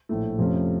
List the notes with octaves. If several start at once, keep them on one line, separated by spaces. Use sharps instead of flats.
A#1 A2 A3
F2 C3 F3 A3 C#4